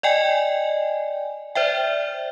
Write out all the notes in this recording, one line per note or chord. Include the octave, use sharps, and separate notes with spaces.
D5 D#5 G5 G#5
C5 D5 E5 G5